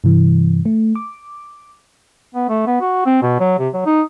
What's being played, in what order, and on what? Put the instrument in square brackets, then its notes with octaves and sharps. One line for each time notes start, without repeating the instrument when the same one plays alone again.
[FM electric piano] G2 C3 E3
A3
D6
[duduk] B3
A3
B3
F#4
C4
B2
F#3
C3
F#3
D#4